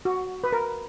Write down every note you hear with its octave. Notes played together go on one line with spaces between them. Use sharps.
F#4
B4
A#4